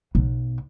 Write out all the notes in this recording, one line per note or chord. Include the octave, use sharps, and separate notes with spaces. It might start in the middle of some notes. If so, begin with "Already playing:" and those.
B1